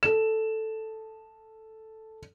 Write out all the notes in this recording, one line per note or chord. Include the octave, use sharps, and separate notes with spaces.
A4 E7